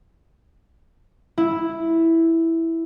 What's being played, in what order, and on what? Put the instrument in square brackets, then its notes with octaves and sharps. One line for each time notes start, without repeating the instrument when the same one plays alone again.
[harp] E4